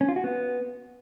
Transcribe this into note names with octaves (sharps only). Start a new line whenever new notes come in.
C#4
F4
F#4
B3